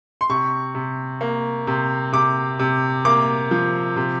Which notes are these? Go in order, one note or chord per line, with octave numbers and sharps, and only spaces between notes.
C6
C3 C#6
C3
A#3
C3
C3 D6
C3
A#3 D6
F3
C3